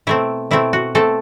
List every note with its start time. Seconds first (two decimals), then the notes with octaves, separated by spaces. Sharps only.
0.07 B2 A3 C4 E4
0.51 B2 A3 C4 E4
0.73 F#4
0.95 B2 A3 C4 A4